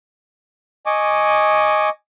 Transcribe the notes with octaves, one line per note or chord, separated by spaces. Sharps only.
D#5 G#5 C#6 D6